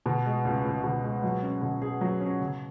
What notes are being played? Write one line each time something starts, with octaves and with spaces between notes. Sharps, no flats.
B2
G#3
C#2
C#2
B2
G#3
F#3
C#4
B2
G#4
F#3
C#4
C#3